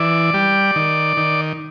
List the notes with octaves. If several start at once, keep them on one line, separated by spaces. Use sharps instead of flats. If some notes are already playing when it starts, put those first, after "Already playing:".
Already playing: E3 D5
G3
D#3
D#3